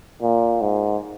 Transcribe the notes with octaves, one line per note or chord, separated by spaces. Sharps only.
A#2
G#2